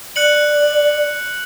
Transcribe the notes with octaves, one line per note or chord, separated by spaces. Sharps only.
D5 F#6 C#7 F#7